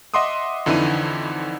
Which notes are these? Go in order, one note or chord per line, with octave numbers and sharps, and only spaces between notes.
D#5 E5 F#5 C6 D6 D#6
F2 D3 E3 D#4 E4 D#7